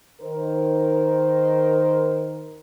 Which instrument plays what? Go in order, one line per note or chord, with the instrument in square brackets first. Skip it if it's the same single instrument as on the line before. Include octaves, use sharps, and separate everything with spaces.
[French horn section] D#3 A#4 C5